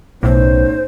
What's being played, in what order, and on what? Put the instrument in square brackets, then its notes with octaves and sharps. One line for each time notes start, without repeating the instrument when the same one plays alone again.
[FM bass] B1 [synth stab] A2 [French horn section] B3 C#4 D#4 [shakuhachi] C5